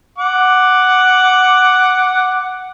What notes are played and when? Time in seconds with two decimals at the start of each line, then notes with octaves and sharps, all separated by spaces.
0.18 F#5 D6